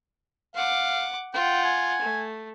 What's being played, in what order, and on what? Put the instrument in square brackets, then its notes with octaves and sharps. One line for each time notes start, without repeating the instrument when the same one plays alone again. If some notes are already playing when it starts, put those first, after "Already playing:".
[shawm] F5 [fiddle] F#5 D6
[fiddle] F4 F#5 [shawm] G5
[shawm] G#5
[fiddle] A3